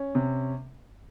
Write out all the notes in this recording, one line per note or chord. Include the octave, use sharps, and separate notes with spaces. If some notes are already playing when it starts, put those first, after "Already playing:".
Already playing: C#4
C3